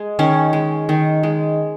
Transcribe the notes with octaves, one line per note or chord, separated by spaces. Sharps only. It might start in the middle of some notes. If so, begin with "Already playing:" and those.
Already playing: G#3
D#3 C#4
G#3
D#3
G#3